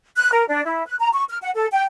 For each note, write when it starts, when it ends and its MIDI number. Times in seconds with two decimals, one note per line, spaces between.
0.17 0.30 90
0.32 0.44 70
0.48 0.63 62
0.65 0.86 64
0.87 0.95 90
0.99 1.09 82
1.13 1.23 85
1.29 1.37 89
1.42 1.51 78
1.56 1.67 69
1.73 1.84 79